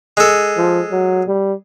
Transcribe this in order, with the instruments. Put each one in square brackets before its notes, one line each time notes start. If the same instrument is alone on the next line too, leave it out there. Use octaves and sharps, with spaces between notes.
[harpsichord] G#3 A4
[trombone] F3
F#3
G3